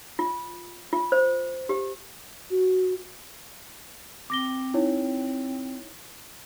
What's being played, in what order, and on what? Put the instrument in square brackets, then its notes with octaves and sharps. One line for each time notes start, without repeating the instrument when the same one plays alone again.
[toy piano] F4
F4
C5
G4
[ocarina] F#4
[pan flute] C4 [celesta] D6 A#6 G7
[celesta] D#4 E4 C#5